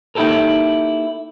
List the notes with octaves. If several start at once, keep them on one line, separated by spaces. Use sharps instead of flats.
A#3 D#4 E4 G4 A4 A#4